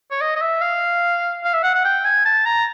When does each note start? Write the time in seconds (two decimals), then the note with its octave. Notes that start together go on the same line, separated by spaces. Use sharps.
0.11 C#5
0.21 D#5
0.36 D#5
0.41 E5
0.61 F5
1.44 F5
1.54 E5
1.63 F#5
1.74 F#5
1.85 G5
2.05 G#5
2.25 A5
2.46 A#5